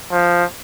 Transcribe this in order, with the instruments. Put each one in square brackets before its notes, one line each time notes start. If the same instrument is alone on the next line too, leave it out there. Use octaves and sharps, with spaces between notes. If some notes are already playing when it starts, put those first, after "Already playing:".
[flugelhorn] F3